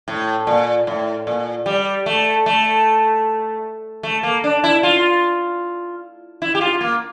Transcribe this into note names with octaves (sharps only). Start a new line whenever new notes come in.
A2
A#2
A2
A#2
G3
A3
A3
A3
A#3
D4
E4
F4
E4
G4
F4
A#3